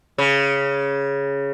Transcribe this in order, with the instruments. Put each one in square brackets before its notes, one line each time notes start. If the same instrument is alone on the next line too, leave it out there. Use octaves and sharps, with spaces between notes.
[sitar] C#3